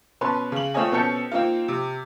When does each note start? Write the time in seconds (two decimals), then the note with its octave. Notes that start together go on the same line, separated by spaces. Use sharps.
0.21 B2 C#4 B4 A5 C6
0.52 C#3 F#7
0.74 A3 C4 F4 C#5 D#5 G#5
0.92 B2 C4 C#4 A4 G6 C#7
1.32 A#3 C4 D#4 F4
1.68 C3